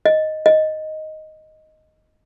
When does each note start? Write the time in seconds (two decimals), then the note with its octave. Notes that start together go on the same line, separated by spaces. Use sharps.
0.06 D#5
0.46 D#5